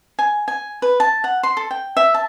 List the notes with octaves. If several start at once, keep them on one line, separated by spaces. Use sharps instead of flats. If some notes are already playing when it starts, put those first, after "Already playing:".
G#5
G#5
B4
A5
F#5
C6
A4
G5
E5
A5